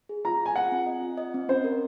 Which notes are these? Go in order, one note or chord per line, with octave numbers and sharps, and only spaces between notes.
G#4
F4 A#5
F4 G#5
F4 F#5
C4
D#5
F4
D#5
C4
C#4 C5
A#4